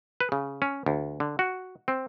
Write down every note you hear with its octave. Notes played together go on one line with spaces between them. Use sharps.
B4
C#3
C#4
D2
D3
F#4
C4